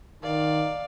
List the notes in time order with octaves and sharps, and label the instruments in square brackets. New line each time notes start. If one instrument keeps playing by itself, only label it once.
[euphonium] D#3 [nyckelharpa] D5 F5